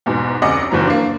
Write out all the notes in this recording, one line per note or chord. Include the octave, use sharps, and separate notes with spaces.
E2 G#2 B2
F1 D2 C#4 D#5 F#5 D6
F#1 D#2 E3 F#3 A#5
A#3 D4